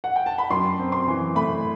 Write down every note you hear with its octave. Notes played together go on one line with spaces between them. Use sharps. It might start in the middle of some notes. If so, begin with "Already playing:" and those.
F#5
G5
A5
B5
F#2 C6
C4
C6
E3
A3 B5